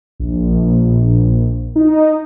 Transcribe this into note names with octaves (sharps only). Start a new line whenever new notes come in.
A#1
D#4